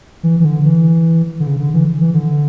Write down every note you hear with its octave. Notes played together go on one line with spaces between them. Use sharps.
E3
E3
D3
E3
D3
C#3
D3
E3
E3
D3